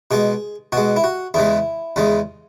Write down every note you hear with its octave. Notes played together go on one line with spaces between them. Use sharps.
B2 G#3 G#4
B2 G#3 F#4
E4
F#4
E2 C#3 E3 G#3 E4
E2 C#3 E3 G#3